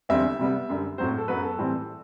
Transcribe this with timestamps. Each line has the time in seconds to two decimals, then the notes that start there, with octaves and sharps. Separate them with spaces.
0.09 E2 D3 G3 C4 E5
0.39 C3 G3 B3
0.69 F#2 D3 G3
0.98 A2 F#3 C4 C5
1.18 A4
1.28 F#2 F#3 B3 B4
1.43 A4
1.58 A2 E3 G3 C4